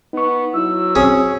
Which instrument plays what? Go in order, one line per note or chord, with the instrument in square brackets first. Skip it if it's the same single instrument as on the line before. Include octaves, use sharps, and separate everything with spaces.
[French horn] B3 [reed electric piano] D#4 C#6
[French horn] F#3 [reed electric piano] E4 [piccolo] E6
[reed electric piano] C4 C#5 [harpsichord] C#4 G#4